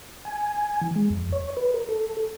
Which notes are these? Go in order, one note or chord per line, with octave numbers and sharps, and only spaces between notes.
G#5
E3
G#3
F2
C#5
B4
A#4
A4